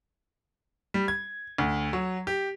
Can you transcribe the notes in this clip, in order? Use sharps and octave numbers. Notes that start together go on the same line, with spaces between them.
G3
G#6
D2
F#3
G4